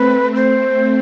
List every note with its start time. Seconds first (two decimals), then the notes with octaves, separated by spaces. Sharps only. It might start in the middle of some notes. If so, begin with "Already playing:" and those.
Already playing: A3 C4 B4
0.35 C5